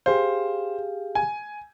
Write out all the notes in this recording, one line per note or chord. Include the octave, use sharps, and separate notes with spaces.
G4 G#4 C5 F5
G#5